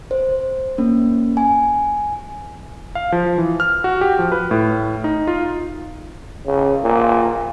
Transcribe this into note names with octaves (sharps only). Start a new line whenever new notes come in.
C5
A#3 C#4
G#5
F5
F3
E3
F6
F#4
G4
F3
B4
A2
D#4
F4
C#3
A#2